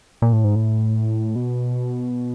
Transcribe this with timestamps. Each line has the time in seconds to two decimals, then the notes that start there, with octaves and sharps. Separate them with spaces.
0.22 A#2
0.33 A2
0.44 G#2
0.55 A2
1.36 B2